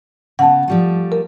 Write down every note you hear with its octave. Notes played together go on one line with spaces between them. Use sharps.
C#3 B3 F#5 A5
F3 G3 A3
A#4